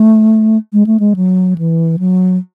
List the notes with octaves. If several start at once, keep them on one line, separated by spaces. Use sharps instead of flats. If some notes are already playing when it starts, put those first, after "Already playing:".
Already playing: A3
G#3
A3
G#3
F#3
E3
F#3